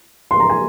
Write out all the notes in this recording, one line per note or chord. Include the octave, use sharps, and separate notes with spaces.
C6
A#5
G#5